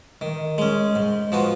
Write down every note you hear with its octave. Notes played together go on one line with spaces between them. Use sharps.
D#3
G#3 C#4
G#2
F3 B3 F#4